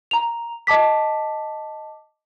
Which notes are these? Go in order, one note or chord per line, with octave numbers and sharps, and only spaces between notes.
A#5 F7
D#5 A5 D6 B6